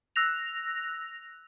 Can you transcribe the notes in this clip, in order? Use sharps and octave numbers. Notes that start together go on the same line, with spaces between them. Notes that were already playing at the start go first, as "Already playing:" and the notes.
E6 F#6 A#6 F7